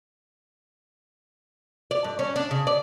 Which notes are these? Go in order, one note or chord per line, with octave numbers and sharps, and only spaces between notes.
D5
G2
C#4
D4
C#3
D5